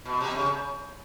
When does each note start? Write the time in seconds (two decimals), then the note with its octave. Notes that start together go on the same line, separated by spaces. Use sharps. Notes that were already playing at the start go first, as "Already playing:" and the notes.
0.05 B2
0.20 C3
0.35 C#3